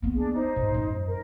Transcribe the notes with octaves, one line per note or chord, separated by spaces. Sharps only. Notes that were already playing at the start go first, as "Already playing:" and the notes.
A#3 B3
D4 G#4
D#4 C5
G#2
F#2
A#4